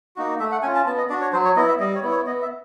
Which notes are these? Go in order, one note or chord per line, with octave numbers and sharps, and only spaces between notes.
A#3 D#4 F#4
A3 E5
F#5
C#4 F4 G#5
A5
B3 A5
D#5
D4 F#4 D5
C#5
F#3 C5
C#5
B3 E4 D#5
E5
G3 D#5
C#5
B3 E4
C#5
B3 D#5
E5